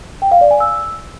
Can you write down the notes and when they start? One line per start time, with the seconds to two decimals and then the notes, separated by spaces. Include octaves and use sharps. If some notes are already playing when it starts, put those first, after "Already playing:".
0.22 G5
0.32 F5
0.41 D5
0.51 G#5
0.60 E6